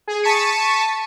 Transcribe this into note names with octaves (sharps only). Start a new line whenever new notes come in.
G#4
A5 C#6 B6 C#7 D#7